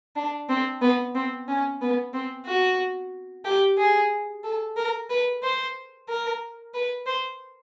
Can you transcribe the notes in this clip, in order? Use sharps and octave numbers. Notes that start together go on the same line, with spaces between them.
D4
C4
B3
C4
C#4
B3
C4
F#4
G4
G#4
A4
A#4
B4
C5
A#4
B4
C5